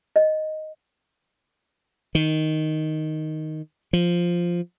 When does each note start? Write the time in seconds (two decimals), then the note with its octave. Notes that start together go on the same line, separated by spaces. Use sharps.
0.16 D#5
2.15 D#3
3.93 F3